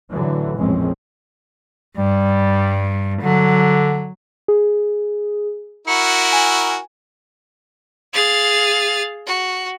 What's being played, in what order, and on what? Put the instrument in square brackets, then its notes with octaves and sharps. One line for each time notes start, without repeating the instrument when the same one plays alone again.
[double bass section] A2 D3 E3 F#3
A#1 F2 A2 G#3 C4 C#4
[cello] G2 [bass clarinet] G3
[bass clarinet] D3 [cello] F#3
[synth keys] G#4
[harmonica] E4 F#4 A#4 [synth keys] C#7
[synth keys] G#5
[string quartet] G#4 F5 A6
F#4